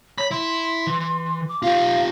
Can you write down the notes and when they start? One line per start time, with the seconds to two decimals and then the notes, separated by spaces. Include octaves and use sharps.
0.18 C#5 B5
0.31 E4 C6
0.87 E3
1.49 D6
1.63 F4 G4 F5